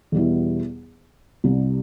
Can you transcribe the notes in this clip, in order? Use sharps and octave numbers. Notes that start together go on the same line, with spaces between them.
E2 B2 G3 B3 E4
C2 C3 G3